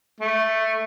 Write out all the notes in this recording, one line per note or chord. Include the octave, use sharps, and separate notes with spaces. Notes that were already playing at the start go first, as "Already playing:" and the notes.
A3